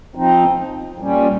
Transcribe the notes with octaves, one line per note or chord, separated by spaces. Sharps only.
F3 C4 D#4
A#2 G3 C#4